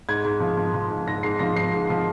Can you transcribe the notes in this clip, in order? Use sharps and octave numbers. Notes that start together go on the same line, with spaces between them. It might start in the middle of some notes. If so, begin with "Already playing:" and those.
G#2 G#6
G#2
F3
F3
F3
G#2
G#2 A#6
G#2 C7
F3 A#6
F3 C7
G#2
F3